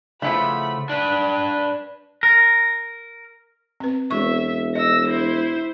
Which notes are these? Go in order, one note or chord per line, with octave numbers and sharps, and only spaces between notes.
C#3 F3 A3 E4 F4 B4 F#5 B5
D4 B4
A#4
C4 B4
E1 E5 C#6
D#5 E6 A#6
E4 C5